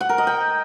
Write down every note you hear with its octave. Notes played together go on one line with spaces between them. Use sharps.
F#5
A#4
D#5
G5